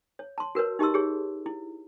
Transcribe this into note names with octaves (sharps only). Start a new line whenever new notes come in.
C#5
A5 C6
F#4 A#4 B4 C#5
D#4 G4 D#5 A5 C6 E6
G4 G#4 C#5
E4